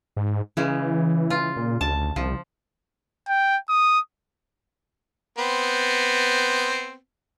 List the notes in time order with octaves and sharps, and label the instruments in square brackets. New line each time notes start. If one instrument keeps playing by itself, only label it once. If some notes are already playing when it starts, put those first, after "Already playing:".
[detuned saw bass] G#2
[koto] C#3 G#3 [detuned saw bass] E3
[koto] F4
[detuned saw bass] A#2
[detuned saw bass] D2 [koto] A5
[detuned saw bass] C2 [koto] F3
[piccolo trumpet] G5
D#6
[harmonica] B3 C4